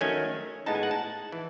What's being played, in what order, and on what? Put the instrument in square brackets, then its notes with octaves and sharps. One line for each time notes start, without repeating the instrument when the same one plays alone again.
[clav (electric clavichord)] D#3 F#3 A3 C#4 G#5
A2 G#3 B3 D#4 A5
G#5
F#5
A5
E3